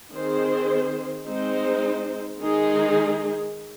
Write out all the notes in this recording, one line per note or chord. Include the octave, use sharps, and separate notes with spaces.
D#3 C4 G#4 C5
G#3 C4 D#4 C5
D#3 G#3 D#4 G#4